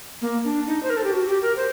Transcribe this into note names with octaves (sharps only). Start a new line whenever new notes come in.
A#3
D4
D#4
C5
A#4
A4
G4
F#4
G4
A#4
C5